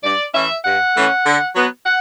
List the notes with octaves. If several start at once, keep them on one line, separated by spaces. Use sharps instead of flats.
G2 D5
E3 A3 C#4 E5
G2 F#5
E3 A3 C#4
D3
F#3 B3
F#5